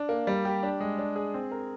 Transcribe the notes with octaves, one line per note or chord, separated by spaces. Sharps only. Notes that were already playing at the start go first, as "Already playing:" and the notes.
Already playing: D4
A#3
G3
G4
D4
G#3
D4
G#4
C4
A#4